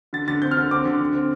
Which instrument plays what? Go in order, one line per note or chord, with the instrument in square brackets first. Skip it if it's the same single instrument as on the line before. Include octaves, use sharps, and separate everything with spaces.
[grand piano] D3 A6
D3 A6
C4 G6
F6
D3
C4 D6
D3
D3
C4